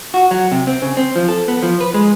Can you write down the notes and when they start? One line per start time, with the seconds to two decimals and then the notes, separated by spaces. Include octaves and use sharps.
0.14 F#4
0.31 F#3
0.52 C3
0.67 C4
0.82 C#3
0.97 C4
1.16 F3
1.28 A4
1.48 B3
1.63 F3
1.81 B4
1.94 G#3